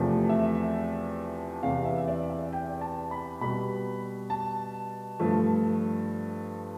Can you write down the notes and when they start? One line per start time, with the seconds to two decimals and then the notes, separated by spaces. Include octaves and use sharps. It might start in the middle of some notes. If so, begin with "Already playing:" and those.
Already playing: E2 C3 F3 A3
0.29 E5
1.63 E2 C3 E3 F5
1.85 E5
1.98 E5
2.07 D5
2.30 E5
2.53 G5
2.81 A5
3.11 B5
3.41 B2 G3 B5
4.30 A5
5.19 G2 F3 A3